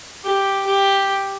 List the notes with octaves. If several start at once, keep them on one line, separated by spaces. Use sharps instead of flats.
G4
G4